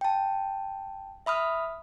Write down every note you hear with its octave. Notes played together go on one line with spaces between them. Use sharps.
G5 A5
E5 B5 D#6 F6